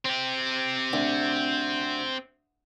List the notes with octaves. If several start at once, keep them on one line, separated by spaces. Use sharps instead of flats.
C4 G4
D2